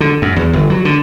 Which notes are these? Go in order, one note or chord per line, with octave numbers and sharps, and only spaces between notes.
D3
F#2
E2
G1
F#3
D3